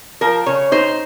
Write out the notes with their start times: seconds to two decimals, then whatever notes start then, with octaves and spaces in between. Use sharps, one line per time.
0.21 F3 A#4
0.46 C#3 C#5
0.72 D#4 C5